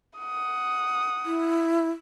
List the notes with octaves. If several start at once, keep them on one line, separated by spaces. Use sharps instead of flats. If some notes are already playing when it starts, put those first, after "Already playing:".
F#5 D#6
E4